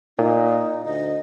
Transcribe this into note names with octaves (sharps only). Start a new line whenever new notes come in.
A#2 D#4
D2 D#5